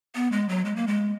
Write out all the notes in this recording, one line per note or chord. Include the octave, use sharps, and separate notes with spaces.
B3
G#3
F#3
G#3
A#3
G#3